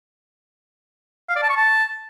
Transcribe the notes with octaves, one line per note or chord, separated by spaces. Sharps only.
F5
D5
A5
C#6
A5